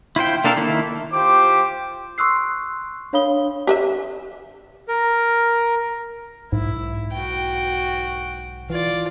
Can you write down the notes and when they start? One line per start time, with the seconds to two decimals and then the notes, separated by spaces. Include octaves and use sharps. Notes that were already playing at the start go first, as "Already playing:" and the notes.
0.16 E4 F4 C5 G5
0.44 A#3 D4 A4 A#4 F5
0.57 D#3 A#3 E4
1.13 F4 G4 C5 D6
2.18 C6 C#6 D#6 E6 F#6 C7
3.13 D4 C#5 F5 B5 D#6 G7
3.67 G4 B4 E5
4.88 A#4
6.52 B1 G#2 E4
7.12 F#4 G5
8.70 E3 F4 D5